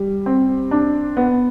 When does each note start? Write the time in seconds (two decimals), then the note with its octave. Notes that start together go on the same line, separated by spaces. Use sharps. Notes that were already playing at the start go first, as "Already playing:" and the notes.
Already playing: G3
0.26 C4
0.71 D4
1.17 B3